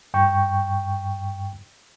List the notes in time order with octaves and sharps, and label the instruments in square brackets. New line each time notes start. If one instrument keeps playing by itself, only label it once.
[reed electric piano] G2 G5 C#6